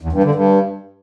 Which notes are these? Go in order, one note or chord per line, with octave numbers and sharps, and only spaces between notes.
E2
G2
D3
G2